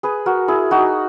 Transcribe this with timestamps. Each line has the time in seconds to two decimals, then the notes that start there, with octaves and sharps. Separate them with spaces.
0.03 G#4 B4
0.26 F#4 A#4
0.48 E4 G#4
0.71 D#4 F#4